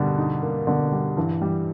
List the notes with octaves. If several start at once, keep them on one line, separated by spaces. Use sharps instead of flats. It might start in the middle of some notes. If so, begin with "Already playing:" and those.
Already playing: B2 D3 G3 A#3
D#4
A#3
B2 D3
G3
G2 E3
G3